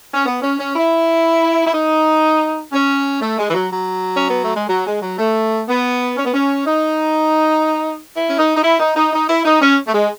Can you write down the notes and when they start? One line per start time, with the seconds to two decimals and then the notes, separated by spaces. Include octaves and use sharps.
0.14 C#4
0.26 B3
0.42 C#4
0.59 C#4
0.75 E4
1.67 E4
1.73 D#4
2.72 C#4
3.22 A3
3.38 G#3
3.50 E3
3.54 F#3
3.71 F#3
4.16 C#4
4.29 B3
4.43 A3
4.56 G#3
4.69 F#3
4.86 G#3
5.02 F#3
5.18 A3
5.68 B3
6.17 C#4
6.25 B3
6.34 C#4
6.66 D#4
8.14 E4
8.27 C#4
8.38 D#4
8.56 D#4
8.63 E4
8.80 D#4
8.96 D#4
9.13 D#4
9.29 E4
9.45 D#4
9.62 C#4
9.87 A3
9.94 G#3